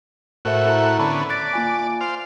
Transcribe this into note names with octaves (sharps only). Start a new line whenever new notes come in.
A2 F#4 A#4 C5 E5
E4 A4 A#5
D3 B3 C#4 A5 B5
D5 F#6 A6 B6
A#3 F4 G#5
C5 F5